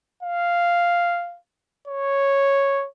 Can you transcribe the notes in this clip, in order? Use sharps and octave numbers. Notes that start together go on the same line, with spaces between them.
F5
C#5